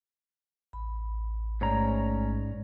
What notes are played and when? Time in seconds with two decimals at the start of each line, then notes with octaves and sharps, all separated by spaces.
0.73 A1 B5
1.61 G#2 A3 C#4 C#5 D5 A#5